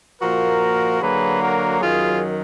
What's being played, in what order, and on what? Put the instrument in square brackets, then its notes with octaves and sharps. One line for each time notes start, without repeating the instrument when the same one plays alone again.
[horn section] A#2 F3 A#3 F#4 A#4
D3 F#3 A#3 G#4 B4
F#4 A#4
F#2 D#3 F#3 F4 G#4